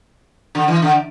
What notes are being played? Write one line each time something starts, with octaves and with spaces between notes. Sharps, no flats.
D3
E3
D3